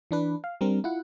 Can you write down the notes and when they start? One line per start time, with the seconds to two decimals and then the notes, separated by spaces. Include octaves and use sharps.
0.11 E3 D4 B4
0.44 F5
0.61 G3 C4 D4 A#4
0.84 E4 F4 F#5